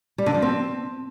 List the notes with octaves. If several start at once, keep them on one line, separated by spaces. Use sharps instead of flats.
G3
D3
F3
C4